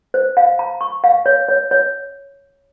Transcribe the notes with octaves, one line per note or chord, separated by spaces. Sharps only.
C5
F5
A#5
C#6
F5
C#5
C#5
C#5